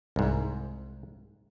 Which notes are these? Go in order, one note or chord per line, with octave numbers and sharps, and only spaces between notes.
C2 G#2